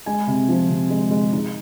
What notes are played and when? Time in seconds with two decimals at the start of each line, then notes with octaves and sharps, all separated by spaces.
0.06 G#3 G#5
0.27 C3
0.49 F3
0.70 C3
0.90 G#3
1.11 G#3
1.33 D#4